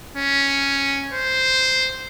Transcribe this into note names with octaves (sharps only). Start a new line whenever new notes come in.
C#4
C5